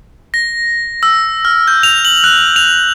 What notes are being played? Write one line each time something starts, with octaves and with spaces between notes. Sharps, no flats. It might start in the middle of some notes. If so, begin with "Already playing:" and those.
A#6
E6
F6
G6
F7
F#7
F#6
F7